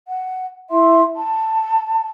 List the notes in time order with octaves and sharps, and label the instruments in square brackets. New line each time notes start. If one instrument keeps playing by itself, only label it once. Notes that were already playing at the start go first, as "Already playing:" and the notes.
[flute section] F#5
E4 E5 C6
A5